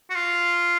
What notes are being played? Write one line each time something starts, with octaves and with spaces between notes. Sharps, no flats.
F#4
F4